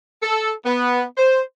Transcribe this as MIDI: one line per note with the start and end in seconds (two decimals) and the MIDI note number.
0.22 0.51 69
0.66 1.02 59
1.18 1.41 72